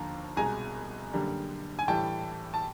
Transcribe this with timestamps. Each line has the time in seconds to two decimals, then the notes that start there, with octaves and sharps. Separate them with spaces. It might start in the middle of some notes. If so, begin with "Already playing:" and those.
Already playing: D#2 D3 F3 A#3 A#5
0.37 C2 B2 G#3 G#5 A#5
1.13 F#2 D3 G3 A#3
1.79 G#5
1.88 A2 E3 G3 G5 A5
2.54 A5